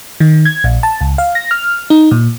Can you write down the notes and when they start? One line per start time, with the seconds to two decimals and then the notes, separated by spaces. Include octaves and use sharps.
0.20 D#3
0.45 G#6
0.64 A#1
0.83 A5
1.01 C#2
1.18 F5
1.35 A#6
1.51 F6
1.90 D#4
2.11 A#2